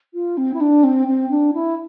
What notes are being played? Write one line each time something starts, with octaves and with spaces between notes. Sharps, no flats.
F4
C4
E4
D4
C4
C4
D4
E4